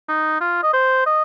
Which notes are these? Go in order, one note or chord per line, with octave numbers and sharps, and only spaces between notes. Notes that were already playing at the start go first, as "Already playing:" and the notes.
D#4
F4
D#5
C5
D#5